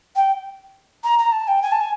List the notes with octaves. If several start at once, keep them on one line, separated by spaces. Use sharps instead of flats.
G5
A#5
A#5
A5
G5
G#5
A5
G#5